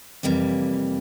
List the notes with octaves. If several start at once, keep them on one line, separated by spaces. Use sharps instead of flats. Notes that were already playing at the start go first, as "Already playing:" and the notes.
F2 C3 E3 G3 A#3